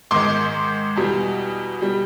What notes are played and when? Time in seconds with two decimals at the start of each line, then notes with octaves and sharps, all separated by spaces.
0.11 G#2 D#3 G#3 C6 D6
0.96 E2 B2 G3
1.81 B2 G3